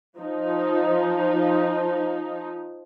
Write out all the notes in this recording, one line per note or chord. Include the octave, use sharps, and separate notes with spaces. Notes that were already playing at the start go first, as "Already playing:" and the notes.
F3 D#4